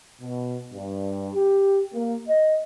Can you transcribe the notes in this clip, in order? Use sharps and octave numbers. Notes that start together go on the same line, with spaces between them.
B2
G2
G4
A#3
D#5